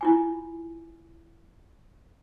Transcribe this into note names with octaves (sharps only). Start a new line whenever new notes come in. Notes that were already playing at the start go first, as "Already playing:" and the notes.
E4 F4 G#5